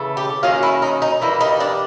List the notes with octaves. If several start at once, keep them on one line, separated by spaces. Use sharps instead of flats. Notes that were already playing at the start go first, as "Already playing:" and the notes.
Already playing: C#3 E3 A3
G4
D#3 F#3 A#3 C#4 F4
E4
D#4
D#4
E3 G3 A#3 E4
D#4
D4